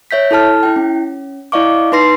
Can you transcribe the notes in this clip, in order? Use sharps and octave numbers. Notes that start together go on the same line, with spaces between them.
C#5 E5 G6 B6
E4 A4 A5 F6
E4 G5
C#4
E4 D5 D#5 F5 C#6 D6
D#4 B4 C6 A#6 C7